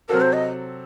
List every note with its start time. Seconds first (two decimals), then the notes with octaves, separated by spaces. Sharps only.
0.09 C3 F#3 C4 F#4 A4 A#4
0.21 C5
0.33 D#5